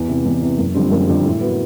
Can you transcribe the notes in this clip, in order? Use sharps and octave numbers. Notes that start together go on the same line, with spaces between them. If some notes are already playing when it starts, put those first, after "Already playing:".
Already playing: E2
C3 E3
E2
C3 E3
F#1
F2 D3 G3 C4
F#1
F2 D3 G3 C4
A2
F#3 B3